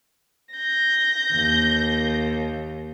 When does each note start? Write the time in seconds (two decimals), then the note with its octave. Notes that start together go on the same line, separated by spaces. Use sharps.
0.55 G6 A#6
1.33 D#2